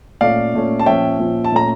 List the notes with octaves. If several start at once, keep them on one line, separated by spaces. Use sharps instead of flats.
A#2 A3 C#4 D5 F5
A#2 A3 C#4
A5
A#2 F3 C#4 E5 G5
A#2 F3 C#4
A5
A#2 A3 C#4 A#5